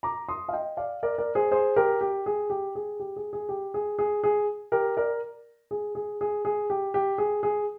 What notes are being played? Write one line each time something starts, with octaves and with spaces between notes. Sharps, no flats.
A#5 D6
C6 D#6
F5
D#5 G5
D5 F5
A#4 D5
A#4 D5
G#4 C5
G#4 C5
G4 A#4
G4
G#4
G4
G#4
G4
G#4
G#4
G4
G#4
G#4
G#4
G4 A#4
A#4 D5
G#4
G#4
G#4
G#4
G4
G4
G#4
G#4